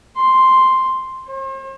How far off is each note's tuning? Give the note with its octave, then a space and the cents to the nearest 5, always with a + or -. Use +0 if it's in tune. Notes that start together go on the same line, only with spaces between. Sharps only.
C6 +0
C5 +45